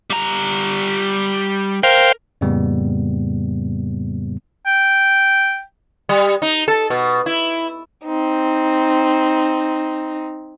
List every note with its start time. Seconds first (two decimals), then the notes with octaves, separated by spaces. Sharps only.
0.10 G3 A#5
1.83 A#4 C5 F5 G5
2.41 F2 A2 C#3 G3 A#3 B3
4.66 G5
6.09 G3
6.42 D#4
6.68 A4
6.90 B2
7.26 E4
8.05 C4 D#4